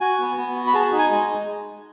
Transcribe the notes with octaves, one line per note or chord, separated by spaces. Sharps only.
F#4 G#5
B3
B3
F#4
B5
G#4 A5
D#4
G#5
G#3